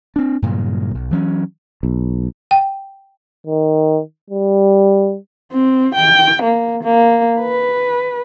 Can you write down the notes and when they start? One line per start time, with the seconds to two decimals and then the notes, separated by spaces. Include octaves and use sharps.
0.16 C4 D4
0.42 G2 A#2 C#3 F#3
0.95 B1
1.11 E3 F#3 B3 C#4
1.83 B1
2.51 G5
3.47 D#3
4.30 G3
5.52 C4
5.95 G5
6.43 A#3
6.84 A#3
7.40 B4